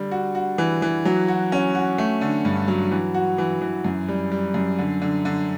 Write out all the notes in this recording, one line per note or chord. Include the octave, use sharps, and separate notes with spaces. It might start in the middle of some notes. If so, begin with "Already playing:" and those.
Already playing: D3 G3
F#4
F#4
E3
E3
F#3
F#4
C#4
F#4
A3
D3
G2
F#3
E3
F#4
E3
E3
F#2
G3
G3
F#2
D3
D3
D3